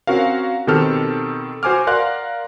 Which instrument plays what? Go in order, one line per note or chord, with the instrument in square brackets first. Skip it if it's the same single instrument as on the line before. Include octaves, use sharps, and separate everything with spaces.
[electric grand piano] C4 C#4 F#4 A#4 F5
B2 D#3 C4 G4 A4 F6
F#4 C5 G#5 D6 F6
A#4 D5 F5 F#5 C6 F#6